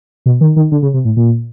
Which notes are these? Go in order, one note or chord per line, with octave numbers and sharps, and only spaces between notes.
B2
D#3
D#3
D3
C#3
C3
A2
A#2